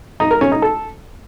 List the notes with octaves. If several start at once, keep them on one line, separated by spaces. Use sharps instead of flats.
D#4
A#4
C#4
D#4
A4